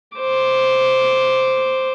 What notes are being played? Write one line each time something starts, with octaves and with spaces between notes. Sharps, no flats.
C5 D6